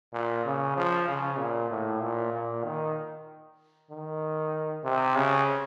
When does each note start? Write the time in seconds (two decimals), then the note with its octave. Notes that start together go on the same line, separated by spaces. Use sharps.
0.14 A#2
0.45 C#3
0.76 F3
1.08 C#3
1.39 A#2
1.71 A2
2.02 A#2
2.33 A#2
2.64 D#3
3.90 D#3
4.84 C3
5.16 C#3